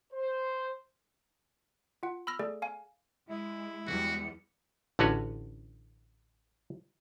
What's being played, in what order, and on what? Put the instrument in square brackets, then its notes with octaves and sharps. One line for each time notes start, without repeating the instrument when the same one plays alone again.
[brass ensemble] C5
[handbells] F4 F#5
B5 E6 F6 A#6
A3 G#4 A4 D5
F5 G#5
[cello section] G#3 [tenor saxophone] E4
[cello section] E2 G3 G#3 [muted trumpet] F#4 [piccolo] C#7
[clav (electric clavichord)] A1 D3 C#4 F#4 B4 C#5